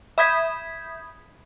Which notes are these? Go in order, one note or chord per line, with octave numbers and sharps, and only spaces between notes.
E5 B5 D#6 G6 G#6 B6